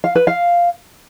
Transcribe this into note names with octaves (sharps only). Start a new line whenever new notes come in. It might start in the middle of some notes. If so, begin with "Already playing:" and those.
F5
B4
F5